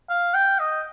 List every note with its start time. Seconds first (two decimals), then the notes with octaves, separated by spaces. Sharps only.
0.10 F5
0.34 G5
0.59 D#5